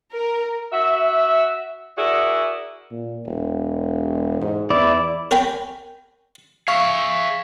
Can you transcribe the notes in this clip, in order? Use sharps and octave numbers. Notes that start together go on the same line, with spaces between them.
A#4
F#4 E5
E4 F#4 G#4 A#4 D5
A#2
E1
G#2
E2 E4 D5
A#4 C#5 G5 G#5 A#5 B5
G#4 E5 F5 C#6